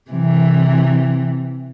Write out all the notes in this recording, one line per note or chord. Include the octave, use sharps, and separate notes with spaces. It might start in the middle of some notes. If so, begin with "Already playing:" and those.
C3 E3